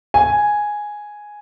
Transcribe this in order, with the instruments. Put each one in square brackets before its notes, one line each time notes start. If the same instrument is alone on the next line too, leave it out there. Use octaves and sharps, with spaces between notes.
[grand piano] G#5